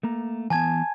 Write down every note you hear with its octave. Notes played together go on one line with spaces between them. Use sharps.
A3 A#3 A#5
E3 B3 G#5 A5 G#6